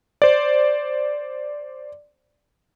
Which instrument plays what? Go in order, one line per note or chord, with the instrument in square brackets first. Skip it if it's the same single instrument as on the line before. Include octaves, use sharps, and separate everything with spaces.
[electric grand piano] C5 D5